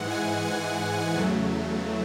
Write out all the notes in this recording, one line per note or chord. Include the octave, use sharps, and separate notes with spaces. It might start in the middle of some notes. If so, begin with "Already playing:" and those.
Already playing: G#2 E3 G#3 F#5
G#5
G#5
E2 C#3 F#3 A3